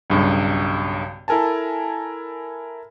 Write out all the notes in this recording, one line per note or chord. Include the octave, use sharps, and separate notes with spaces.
B1 G2 C#3
E4 A4 A#4 G#5 A5